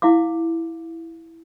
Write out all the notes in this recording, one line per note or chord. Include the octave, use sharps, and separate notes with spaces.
E4 F5 D6